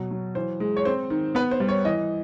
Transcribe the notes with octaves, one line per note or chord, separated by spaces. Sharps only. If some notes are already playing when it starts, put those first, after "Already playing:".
Already playing: B2 F#3
F#3
E3 C5
G#3
C#5
C4 C5
D#3
B3 B4
C5
G3
C#5
E3 D#5